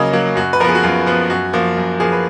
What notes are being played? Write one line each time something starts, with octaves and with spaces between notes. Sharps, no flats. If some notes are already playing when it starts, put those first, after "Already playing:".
Already playing: C#3 F#3 A#3 C#5 D#5
F#3 A#3
F#2 F#4
B4
F3 B3 G#4 A#4
F#4
F#2 F4
F3 B3
F#2 F#4
F3 A#3
F#2
F3 A#3 G#4
B4